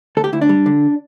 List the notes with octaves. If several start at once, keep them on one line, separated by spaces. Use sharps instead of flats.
D2 A4
G4
D2 E4
D4
G3
D3